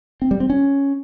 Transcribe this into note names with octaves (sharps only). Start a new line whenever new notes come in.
C4
G3
C4
C#4